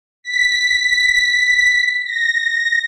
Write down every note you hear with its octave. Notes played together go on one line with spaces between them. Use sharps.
B6
A#6